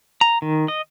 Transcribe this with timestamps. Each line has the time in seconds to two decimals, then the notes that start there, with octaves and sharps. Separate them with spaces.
0.21 A#5
0.42 D#3
0.68 D#5